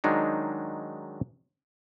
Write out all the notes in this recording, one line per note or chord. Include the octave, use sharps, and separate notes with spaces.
D#3 F#3 G#3 D4 D#4